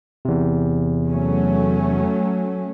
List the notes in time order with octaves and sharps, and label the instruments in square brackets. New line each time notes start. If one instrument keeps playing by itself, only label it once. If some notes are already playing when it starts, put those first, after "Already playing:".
[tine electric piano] E2 C3
[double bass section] F#3 A3 C#4